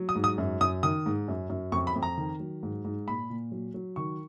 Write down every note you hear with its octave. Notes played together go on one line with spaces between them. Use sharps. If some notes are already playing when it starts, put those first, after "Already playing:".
Already playing: F#3
D#6
G#2
D#6
F#2
F#2 D#6
D#3 D#6
G#2
F#2
F#2
F2 C#6
B5
F2
A#5
D#3
F#3
G#2
G#2
A#2 B5
A#2
F#3
F#3
D#3 C#6